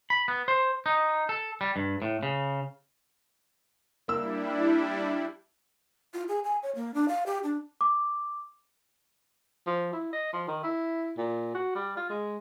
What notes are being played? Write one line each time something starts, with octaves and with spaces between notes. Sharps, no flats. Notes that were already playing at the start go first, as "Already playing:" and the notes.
B5
B3
C5
D#4
A4
G3
G2
A2
C#3
G3 A#3 D4 E4 E6
F4
G#4
G#5
C#5
A#3
D4
F5
G4
D4
D6
F3
E4
D#5
F3
D#3
E4
A#2
F#4
G3
F4
G#3